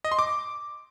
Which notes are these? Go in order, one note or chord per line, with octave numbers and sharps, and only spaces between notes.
D#5
C6
D6